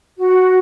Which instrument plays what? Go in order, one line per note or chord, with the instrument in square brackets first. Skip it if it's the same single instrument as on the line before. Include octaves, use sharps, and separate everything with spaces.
[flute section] F#4